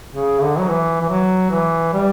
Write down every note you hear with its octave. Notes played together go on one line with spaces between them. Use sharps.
C#3
D3
F#3
E3
E3
F#3
E3
G3